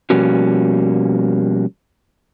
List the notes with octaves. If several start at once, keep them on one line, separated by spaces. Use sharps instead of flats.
B2 F3 G3 A#3 C#4 F#4